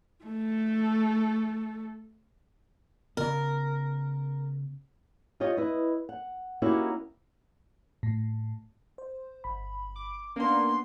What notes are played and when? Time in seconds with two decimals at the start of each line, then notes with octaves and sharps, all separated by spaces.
0.24 A3 A4
3.17 C#3 B3 A#4
5.40 F4 G4 C#5 D#5
5.57 E4 B4 D#5
6.09 F#5
6.62 A#3 C#4 D#4 E4 F#4 G4
8.03 A2
8.98 C5
9.44 G1 B5
9.96 D6
10.36 A#3 B3 C#4 D4 C6